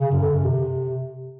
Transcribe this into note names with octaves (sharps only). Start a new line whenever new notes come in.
C#3
F#2
D3
F#2
C3